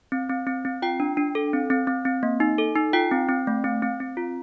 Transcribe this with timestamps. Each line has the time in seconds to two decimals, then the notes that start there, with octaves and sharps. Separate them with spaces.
0.12 C4
0.29 C4
0.47 C4
0.65 C4
0.82 F4 G5
1.00 D4
1.17 D4
1.35 A4
1.53 C4
1.70 C4
1.87 C4
2.05 C4
2.23 A#3
2.40 D#4
2.58 A4
2.75 D#4
2.93 F4 G5
3.11 C4
3.29 C4
3.47 A3
3.64 C4
3.83 C4
4.00 C4
4.17 F4